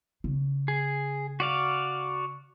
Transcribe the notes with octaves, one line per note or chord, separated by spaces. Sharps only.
C#3
G#4
F#4 D5 F5